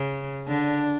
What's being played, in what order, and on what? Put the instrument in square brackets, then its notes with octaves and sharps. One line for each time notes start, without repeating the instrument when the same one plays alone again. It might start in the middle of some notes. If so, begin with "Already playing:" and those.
Already playing: [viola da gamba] C#3
[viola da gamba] D3 [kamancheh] D4